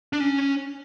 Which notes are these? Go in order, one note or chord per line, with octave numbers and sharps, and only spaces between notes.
D4
C#4